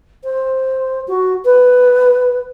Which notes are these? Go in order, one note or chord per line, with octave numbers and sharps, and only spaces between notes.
C5
F#4
B4